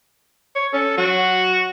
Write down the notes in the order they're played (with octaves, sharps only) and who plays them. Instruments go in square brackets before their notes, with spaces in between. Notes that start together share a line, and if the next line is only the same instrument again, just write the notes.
[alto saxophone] C#5
[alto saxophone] C#4 [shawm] A4
[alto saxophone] F#3 [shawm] F#4